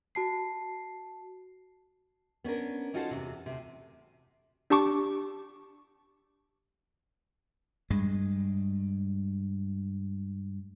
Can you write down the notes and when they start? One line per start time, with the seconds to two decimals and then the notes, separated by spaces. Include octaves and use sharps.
0.15 F#4 A5 C7
2.44 B3 C#4 D4 A#4
2.94 C#4 D#4 F4 F#4 A4 C5
3.11 E2 G2 C3
3.46 D2 C3
4.70 D4 G4 A5 C#6 D6
7.90 G2 G#3